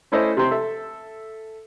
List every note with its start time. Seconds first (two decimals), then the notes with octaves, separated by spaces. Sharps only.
0.12 A3 C#4 E4 A4 C5 D#5
0.37 C3 C4
0.51 A4 E5